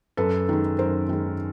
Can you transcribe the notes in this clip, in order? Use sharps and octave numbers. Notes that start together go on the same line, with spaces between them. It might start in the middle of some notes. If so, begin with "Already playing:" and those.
F#2 A4 B4
D#3 G#3
F#2 A#4 C5
D#3 G#3